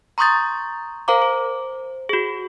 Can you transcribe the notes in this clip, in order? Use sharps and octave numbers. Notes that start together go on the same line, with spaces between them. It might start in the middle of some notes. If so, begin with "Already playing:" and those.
A#5 C6 C#6 D#6 G6 A6
A#4 C5 F5 A#5 D6
C5
F#4 G#4